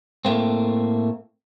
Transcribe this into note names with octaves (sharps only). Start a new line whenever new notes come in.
A2 A3 A#3 C4